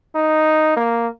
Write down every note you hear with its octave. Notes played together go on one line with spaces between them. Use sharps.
D#4
A#3